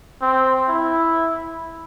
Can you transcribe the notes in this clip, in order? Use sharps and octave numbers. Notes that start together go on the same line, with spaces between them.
C4
E4